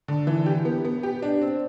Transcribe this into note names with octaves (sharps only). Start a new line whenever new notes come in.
D3
E3
G4
B3
B3
G4
D4
C4